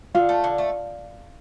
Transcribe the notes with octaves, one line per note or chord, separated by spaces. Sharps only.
D3 F4
A3
D3
A3